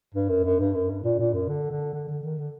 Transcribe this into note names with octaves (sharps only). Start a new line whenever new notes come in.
G2
F#2
F#2
G2
F#2
G2
A#2
A#2
F#2
D3
D3
D3
D3
D#3
D3